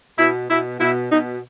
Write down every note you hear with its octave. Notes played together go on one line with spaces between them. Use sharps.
B2 E4
B2 E4
B2 E4
B2 D#4